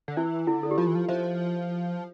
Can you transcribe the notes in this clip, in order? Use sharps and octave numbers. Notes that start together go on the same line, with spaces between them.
D3
E3 E4
D3 E4
A4
G4
F3 F4
E3
F3
F3 C5 E5